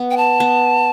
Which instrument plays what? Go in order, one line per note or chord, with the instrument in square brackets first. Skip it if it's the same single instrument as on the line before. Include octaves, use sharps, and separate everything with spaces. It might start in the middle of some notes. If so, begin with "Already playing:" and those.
Already playing: [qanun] B3
[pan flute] G5
A5
[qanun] B3